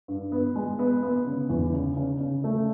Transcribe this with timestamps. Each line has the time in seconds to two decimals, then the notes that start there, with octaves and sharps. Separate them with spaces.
0.08 G2
0.32 B3
0.56 G#3
0.79 B3
1.03 B3
1.26 C#3
1.49 E2
1.73 C#3
1.97 C#3
2.20 C#3
2.44 A3